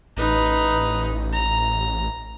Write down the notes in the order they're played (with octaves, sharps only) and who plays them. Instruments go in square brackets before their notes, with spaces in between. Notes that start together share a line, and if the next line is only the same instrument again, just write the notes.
[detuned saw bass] A1 [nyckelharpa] D#4 B4
[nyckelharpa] A#5